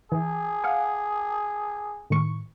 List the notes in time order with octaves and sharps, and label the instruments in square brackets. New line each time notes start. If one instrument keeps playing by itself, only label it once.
[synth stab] E3 [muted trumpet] G#4
[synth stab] F5 F#5 G#5
A2 D#3 C#6